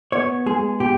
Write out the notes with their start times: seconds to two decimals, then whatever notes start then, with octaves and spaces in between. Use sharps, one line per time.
0.12 B3 C#5
0.46 G#3 G#4
0.80 B2 G4